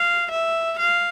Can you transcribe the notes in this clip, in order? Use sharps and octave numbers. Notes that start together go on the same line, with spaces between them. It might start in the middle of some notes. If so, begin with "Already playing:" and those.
Already playing: F5
E5
F5